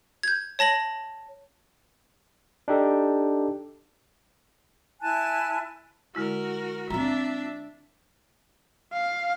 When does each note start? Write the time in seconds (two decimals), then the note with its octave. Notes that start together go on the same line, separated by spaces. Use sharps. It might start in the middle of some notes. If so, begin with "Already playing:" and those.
0.23 G6 G#6
0.59 C#5 A5 A#6 F#7
2.68 D4 D#4 G4 A4
5.01 E4 G#5 A5 F#6
6.15 D3 G#3 E4 F#4 A#4
6.90 C4 D4 F4 E5 A#5
8.93 F5